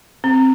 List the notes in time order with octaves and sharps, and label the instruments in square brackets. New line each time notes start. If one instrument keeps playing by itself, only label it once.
[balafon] C4